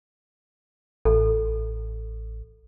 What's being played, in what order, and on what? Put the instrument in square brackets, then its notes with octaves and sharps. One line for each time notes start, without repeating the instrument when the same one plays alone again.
[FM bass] A1 [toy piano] A4